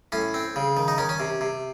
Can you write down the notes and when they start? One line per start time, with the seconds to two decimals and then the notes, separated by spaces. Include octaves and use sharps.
0.12 A2 C#4
0.34 C4
0.56 C#3
0.77 D#3
0.88 D#4
0.98 D#3 C#4
1.09 C#4
1.20 C3
1.41 C3